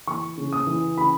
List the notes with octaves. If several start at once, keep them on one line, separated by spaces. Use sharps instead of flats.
E3 C#6
C#3
D#6
E3
C#3 B5